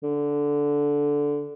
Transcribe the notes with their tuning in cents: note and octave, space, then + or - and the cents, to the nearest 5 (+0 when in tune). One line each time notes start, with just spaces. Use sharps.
D3 -10